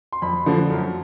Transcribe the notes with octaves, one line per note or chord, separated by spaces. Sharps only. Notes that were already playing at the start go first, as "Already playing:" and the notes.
C6
F2 B5
D3 F3 A3
F#2